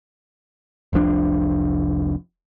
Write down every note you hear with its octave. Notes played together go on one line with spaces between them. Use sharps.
F1 C2 F3 D4